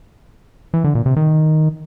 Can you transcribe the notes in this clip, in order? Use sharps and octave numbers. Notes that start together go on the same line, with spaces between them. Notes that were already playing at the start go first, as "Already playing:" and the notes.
E3
D3
A#2
C3
D#3